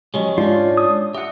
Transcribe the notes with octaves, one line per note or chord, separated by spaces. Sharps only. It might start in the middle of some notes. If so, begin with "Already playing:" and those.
F3 F#3 G#3 C#4 G4 D#5
G#2 C#4 D4 F4 C#5
D#6
G4 E5 F#5